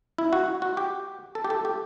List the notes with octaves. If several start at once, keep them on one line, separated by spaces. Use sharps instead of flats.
E4
F#4
F#4
G4
A4
G4
A4
G4